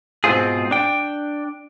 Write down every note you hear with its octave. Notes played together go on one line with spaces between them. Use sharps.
G#2 B2 C4 F4 G#4
D4 G5